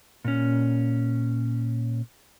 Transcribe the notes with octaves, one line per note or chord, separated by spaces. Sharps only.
A#2 C#4